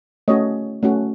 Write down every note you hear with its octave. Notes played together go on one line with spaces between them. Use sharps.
A3 C#4 F#4 C#5 D#5
A3 C#4 F#4